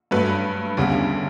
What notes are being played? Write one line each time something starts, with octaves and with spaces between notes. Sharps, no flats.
G2 F#3 A3 B4
D2 C#3 G3 B3